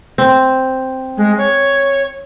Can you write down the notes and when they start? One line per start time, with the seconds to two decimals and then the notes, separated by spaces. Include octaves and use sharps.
0.18 C4
1.17 G#3
1.38 C#5